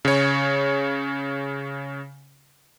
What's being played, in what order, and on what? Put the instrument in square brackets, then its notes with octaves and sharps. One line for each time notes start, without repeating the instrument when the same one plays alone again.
[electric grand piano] C#3 C#5